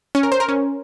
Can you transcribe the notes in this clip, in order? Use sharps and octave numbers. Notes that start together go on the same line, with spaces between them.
C#4
A#4
C5
A#4
C#4